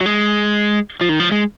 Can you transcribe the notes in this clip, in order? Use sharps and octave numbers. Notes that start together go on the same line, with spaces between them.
F#3
G#3
F3
D#3
F3
G#3